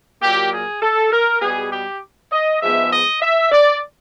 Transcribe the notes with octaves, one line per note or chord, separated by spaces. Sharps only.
A#2 F#3 A#3 G4
G#4
A4
A#4
B2 G3 B3 G#4
G4
D#5
G#2 F3 G#3 B3 E5
D#5
E5
D5